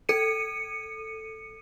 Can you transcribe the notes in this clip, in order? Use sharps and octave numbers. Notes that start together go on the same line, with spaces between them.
A4 C#7 D#7